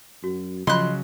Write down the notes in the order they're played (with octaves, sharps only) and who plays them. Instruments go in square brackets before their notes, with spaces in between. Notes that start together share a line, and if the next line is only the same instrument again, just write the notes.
[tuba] F#2 [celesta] F#4
[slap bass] C#3 F#3 [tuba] F3 [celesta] D#5 [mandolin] C6 F#6